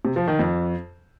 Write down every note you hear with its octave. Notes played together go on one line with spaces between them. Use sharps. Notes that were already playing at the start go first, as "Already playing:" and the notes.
C3
F3
D#3
F2